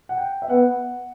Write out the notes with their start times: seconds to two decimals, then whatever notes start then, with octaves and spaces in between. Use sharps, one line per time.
0.09 F#5
0.18 G5
0.42 E5
0.49 B3 F#5